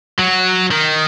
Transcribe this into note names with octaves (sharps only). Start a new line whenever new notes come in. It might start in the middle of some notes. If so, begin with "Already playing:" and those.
F#3
D#3